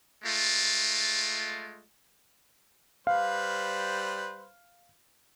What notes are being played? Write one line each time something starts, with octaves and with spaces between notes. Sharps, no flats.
G#3 A3 F4
G3 B4 C5 F5